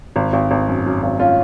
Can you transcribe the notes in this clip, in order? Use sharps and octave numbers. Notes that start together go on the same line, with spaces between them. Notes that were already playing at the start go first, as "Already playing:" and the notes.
G#1
G#1
G#1
F#2
F#2
G#1
C#4 F4